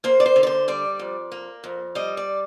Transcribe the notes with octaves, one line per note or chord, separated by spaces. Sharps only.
A#3 C5
D5
C5
D3
D5
C5
G3 D5
F2
A#3
F2
G3 D#5
D5